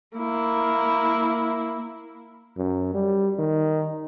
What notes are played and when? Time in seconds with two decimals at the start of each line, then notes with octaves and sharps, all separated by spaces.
0.17 A#3 E4
2.57 F#2
2.94 G3
3.39 D#3